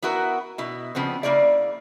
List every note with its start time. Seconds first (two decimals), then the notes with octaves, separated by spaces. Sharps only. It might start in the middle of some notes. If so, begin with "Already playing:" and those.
0.02 B3 E4 F#4 A#4 B4
0.58 B2 E4
0.95 C#3 F3 B3 C4
1.23 C#3 A#3 E4 C5 D5